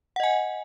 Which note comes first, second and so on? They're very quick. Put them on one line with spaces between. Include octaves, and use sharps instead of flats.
F#5 D#5 G#5